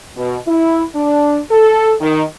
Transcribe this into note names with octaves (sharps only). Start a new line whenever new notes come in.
B2
E4
D4
A4
D#3